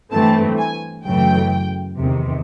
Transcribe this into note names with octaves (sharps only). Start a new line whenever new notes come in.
G2 E3 A3 C4 A5
G#5
F#2 C#3 E3 A3 G5
E2 C3 D#3